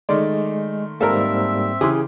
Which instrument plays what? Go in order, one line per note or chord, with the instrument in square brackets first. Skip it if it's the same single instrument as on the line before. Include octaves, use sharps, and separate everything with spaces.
[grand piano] D#3 A3 C6 [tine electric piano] G#3 [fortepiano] D5
[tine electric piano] G#2 G3 A#3 [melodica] C4 E5 [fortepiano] A4 A#4
[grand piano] C#3 E3 [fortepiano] G4 C6 [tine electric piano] G#4